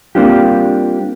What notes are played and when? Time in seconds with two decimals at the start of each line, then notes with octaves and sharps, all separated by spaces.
0.15 G3 A#3 C4 D4 F4 G4